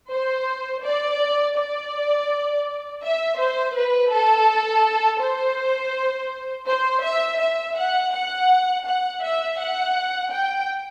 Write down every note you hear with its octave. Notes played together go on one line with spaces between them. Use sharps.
C5
D5
D5
E5
C5
B4
A4
C5
C5
E5
E5
F#5
F#5
F#5
E5
F#5
G5